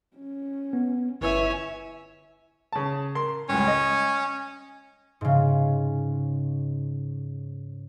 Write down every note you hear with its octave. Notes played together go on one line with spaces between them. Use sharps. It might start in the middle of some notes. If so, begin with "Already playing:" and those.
C#4
B3
G1 E4 B4 C#5 E5 G#5 E6
C#3 A5
A#4 C6
C#2 G2 C#4
D#5
G#2 C#3